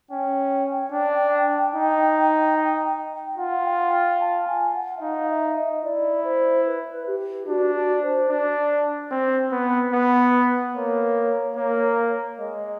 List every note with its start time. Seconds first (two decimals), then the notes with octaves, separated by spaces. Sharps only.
0.10 C#4 G5
0.92 D4
1.75 D#4
3.27 G5
3.38 F4 F#5
3.65 G5
3.92 G5
4.21 A5
4.47 G#5
4.75 F#5
4.97 E5
5.02 D#4 F5
5.30 E5
5.57 D#5
5.84 E4 D5
6.24 C5
6.66 B4
7.07 G4
7.48 D4 F#4
7.75 F#4
8.02 C5
8.29 D4
9.12 C4
9.52 B3
9.93 B3
10.75 A#3 C#5
11.57 A#3
12.39 G#3 D#5